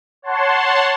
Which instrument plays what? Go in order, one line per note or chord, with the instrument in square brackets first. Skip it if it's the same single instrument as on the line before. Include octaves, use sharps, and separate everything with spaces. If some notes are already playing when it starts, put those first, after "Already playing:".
[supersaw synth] C#5 F#5 A5 C6